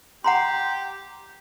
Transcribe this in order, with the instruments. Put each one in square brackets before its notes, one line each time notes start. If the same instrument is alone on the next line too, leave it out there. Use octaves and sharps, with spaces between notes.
[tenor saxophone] G4 [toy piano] F#5 A#5 C6